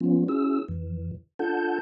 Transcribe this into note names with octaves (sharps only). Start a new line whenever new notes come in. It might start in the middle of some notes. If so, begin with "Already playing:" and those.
F3 B3 C#4 F4
C#4 E4 F#4 G#4 E6
F2 E3
D4 F4 A4 F#5 A5 G6